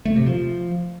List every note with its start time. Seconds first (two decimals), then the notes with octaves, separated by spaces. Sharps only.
0.05 A3
0.16 C3
0.26 F3